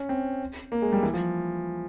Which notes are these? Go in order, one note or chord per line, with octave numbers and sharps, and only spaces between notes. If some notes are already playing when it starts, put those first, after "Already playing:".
Already playing: C#4
C4
A#3
G#3
G3
E3
F3